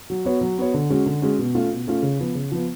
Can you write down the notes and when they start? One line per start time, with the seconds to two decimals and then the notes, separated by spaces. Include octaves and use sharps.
0.10 F#3
0.25 B3 F#4 C#5
0.41 F#3
0.58 B3 F#4 C#5
0.74 D3
0.90 G#3 C#4 F#4
1.06 D3
1.22 G#3 C#4 F#4
1.39 B2
1.55 A3 C#4 F4
1.71 B2
1.87 A3 C#4 F4
2.03 C#3
2.19 F3 B3
2.35 C#3
2.52 F3 B3